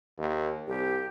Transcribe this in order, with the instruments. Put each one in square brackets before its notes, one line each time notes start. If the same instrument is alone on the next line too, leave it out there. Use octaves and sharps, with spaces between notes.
[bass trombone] D#2
[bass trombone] C2 [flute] G4